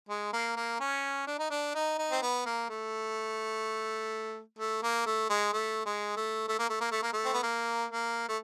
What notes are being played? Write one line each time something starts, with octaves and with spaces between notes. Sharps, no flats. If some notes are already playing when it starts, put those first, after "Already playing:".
G#3
A#3
A#3
C#4
D4
D#4
D4
D#4
D#4
C4
B3
A#3
A3
A3
A#3
A3
G#3
A3
G#3
A3
A3
A#3
A3
A#3
A3
A#3
A3
C4
B3
A#3
A#3
A3